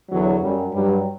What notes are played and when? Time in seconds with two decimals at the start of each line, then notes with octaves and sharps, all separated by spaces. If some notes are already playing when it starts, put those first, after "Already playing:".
0.10 E2 D3 F#3
0.41 F#2 F#3 G3
0.73 G2 F#3 G3